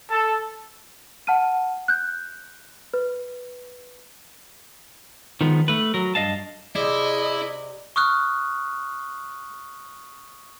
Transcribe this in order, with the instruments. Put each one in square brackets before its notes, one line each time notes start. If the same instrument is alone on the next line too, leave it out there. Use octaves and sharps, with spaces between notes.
[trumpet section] A4
[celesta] F#5 A5 F6 D#7
F#6 G6
B4
[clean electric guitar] D#3 F3 G#3 B3
A3 B4
F#3 A#4
G2 D#5 F5 A5
[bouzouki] C3 D5 [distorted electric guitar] E4 [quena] G#4 [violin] D#5
[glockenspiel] C#6 D#6 F6 F#6